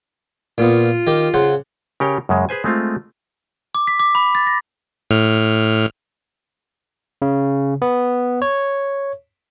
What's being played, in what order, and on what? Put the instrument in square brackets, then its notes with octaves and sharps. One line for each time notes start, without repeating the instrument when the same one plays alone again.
[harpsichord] A#2 B3 [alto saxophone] F4
[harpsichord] D#3 G4
C#3 C5 F#5
[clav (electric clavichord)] C#3 G4 A#4 C#5 G5
F#2 C#3 G#3
G#4 B4 C5 G#5
G#3 A3 C4 F4
[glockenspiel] D6
B6
D6
B5
A6
A#6
[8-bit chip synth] A2 F6
[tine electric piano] C#3
B3
C#5